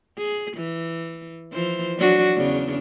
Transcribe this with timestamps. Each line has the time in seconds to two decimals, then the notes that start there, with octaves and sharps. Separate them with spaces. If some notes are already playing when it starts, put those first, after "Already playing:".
0.17 G#4
0.57 E3
1.52 E3 F3 C5
1.98 F#3 D4 F#4
2.36 E2 C#3 D4